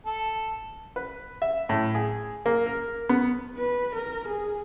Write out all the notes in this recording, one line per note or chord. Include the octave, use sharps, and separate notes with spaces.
A4
B4
E5
A2
G#4
A#3
A#4
B3
B4
A#4
G#4